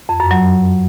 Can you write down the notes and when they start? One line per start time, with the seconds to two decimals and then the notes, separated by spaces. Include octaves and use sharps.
0.09 F2
0.20 F#2
0.31 F#3